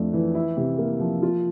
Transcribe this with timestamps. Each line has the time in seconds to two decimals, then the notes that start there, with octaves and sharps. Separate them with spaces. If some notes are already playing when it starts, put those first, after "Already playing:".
Already playing: F2 A3 D4
0.13 E3
0.35 E4
0.57 C3
0.78 A#3
1.00 F3
1.22 F4